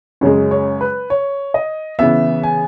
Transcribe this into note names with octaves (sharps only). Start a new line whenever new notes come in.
F#2 C#3 G#3 C#5
C#5
B4
C#5
D#5
C#3 E3 B3 E5
G#5